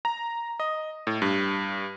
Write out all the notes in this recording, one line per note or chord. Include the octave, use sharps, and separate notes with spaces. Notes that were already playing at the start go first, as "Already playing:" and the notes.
A#5
D#5
A2
G2